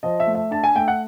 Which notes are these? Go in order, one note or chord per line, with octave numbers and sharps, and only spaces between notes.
F3 D#5
E5
A3
E5
D4 A5
G#5
A3 G5
F#5